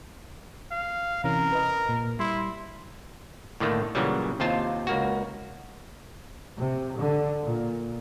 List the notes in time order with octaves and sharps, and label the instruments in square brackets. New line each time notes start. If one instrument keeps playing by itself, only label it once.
[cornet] F5
[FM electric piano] C3 E3 C#4 [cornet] A#4
[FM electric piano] B4 D#5
A#2
[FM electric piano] G3 C6 [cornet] E4
[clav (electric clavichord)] A2 D3 D#3 A3 A#3
A#2 C#3 E3 F#3 G3
D#2 C3 F4 C5 A5
C#2 A#3 F#4
[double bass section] C3
D3
A#2